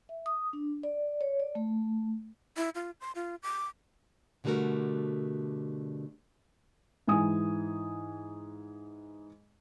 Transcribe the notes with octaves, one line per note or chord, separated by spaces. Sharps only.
E5
D#6
D4
D5
C#5
D5
A3
E4
F4
C6
F4
D6
B2 D3 G3 A3 F#4 A#4
G#2 E3 G#5 D#6